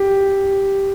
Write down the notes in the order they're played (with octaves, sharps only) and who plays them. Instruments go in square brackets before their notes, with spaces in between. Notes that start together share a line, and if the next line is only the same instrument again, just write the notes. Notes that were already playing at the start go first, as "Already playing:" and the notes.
Already playing: [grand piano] G4